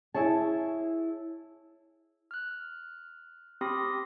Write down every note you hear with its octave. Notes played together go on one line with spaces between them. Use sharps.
E4 G#4 C#5 A5
F6 F#6
C4 G4 B5 C6 D#6 A#6